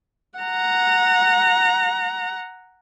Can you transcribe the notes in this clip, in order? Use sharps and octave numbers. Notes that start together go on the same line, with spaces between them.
F#5 A#5